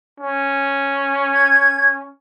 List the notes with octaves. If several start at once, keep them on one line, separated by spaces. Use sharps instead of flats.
C#4
G#6